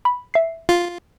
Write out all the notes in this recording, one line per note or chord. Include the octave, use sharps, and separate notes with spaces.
B5
E5 C7
F4